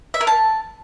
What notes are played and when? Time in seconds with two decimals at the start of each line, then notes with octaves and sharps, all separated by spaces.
0.14 E5
0.21 A#4
0.27 A5